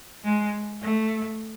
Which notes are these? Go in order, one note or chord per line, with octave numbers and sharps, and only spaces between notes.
G#3
A3